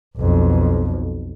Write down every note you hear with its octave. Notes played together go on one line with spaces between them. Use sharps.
B1 F2